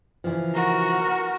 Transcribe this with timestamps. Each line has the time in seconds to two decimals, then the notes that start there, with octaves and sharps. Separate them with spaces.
0.24 C#3 E3 F3
0.55 F#4 A#4